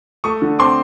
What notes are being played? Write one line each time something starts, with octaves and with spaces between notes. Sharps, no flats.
A3 C#6 D#6
D3
C4 C6 D6